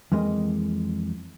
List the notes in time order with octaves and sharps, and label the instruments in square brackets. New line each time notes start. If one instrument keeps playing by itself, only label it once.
[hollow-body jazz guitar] F2 E3 G#3 A#3 D#5